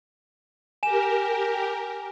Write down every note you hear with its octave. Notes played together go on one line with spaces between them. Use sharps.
G4 A#4 G#5 E7